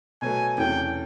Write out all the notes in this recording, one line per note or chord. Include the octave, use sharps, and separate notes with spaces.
B2 F#3 A3 G#5
E2 C3 E3 A3 C#4 G5